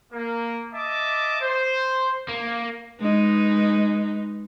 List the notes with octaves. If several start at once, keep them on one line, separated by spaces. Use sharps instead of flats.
A#3
D#5 E5 A5 D6
C5
A#3
G#3 D#4 B4